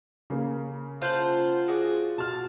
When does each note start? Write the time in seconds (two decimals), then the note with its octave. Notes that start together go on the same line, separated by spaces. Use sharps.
0.30 C#3 A#3
1.02 F4 C5 F#5 A5 G6
1.68 F#4 G#4 D5
2.18 B2 A5 C6 F6